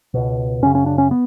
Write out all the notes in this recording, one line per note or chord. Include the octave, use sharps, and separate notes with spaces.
C#2 B2
F#2 C#3 C#4
C#4
D4
C#4
B3